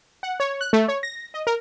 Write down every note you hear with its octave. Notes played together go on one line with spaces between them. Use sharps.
F#5
C#5
F#6
A3
C#5
A#6
D#5
A#4